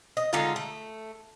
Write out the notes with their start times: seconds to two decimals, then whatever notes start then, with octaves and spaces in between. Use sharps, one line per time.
0.17 D#5
0.33 D3 G#3 D#4 F4
0.56 A3